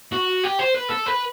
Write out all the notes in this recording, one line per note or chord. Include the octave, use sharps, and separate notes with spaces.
F#4
G4
C5
B4
A4
B4